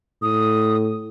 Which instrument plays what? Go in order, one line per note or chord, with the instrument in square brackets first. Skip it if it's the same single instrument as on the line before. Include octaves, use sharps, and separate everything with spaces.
[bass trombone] A2 [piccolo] D#6